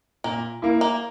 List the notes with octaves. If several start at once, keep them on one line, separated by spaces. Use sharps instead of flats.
A#2 A#3
A#3 E4
A#3